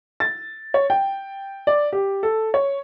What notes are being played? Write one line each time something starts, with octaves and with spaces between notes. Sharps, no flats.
A6
C#5
G5
D5
G4
A4
C#5